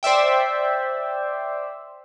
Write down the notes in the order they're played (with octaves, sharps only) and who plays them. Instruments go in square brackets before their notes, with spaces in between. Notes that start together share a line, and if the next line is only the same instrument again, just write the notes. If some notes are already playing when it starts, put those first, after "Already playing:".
[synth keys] C5 D5 E5 G5